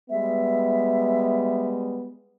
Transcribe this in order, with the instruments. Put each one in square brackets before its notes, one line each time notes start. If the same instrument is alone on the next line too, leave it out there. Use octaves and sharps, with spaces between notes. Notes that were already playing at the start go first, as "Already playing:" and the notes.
[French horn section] G3 G#3 B3 [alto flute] E5